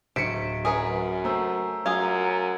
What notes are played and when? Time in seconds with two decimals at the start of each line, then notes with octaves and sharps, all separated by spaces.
0.16 D1 C5 B6 C#7 D7
0.65 F#2 G#4 A#4 B4
1.25 A3 C5 A#5 E6
1.86 F#2 F4 G#4 A#4 G#6